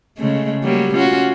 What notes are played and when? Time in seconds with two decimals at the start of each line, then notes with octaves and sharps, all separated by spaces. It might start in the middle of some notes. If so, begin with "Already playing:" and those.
0.17 C#3 G#3 A3
0.63 F#3 G3 A#3
0.94 C#4 F4 F#4